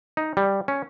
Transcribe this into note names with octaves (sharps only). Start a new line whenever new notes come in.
D#4
G3
C#4